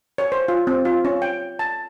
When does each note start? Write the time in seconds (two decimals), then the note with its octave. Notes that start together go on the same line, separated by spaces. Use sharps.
0.18 C#5
0.32 C5
0.48 F4
0.67 C4
0.85 F4
1.05 C#4
1.22 G5
1.59 A5